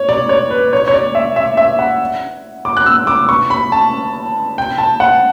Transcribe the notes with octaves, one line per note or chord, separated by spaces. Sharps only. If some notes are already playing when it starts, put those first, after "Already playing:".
Already playing: C#5
D5
C#5
B4
C#5
C#5
D5
E5
E5
E5
F#5
D6
F#6
E6
D6
C#6
B5
A5
G5
A5
F#5